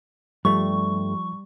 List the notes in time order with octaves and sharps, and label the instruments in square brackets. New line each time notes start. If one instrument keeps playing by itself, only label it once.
[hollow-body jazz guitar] G2 A3 [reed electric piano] F3 [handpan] G3 [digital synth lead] C#6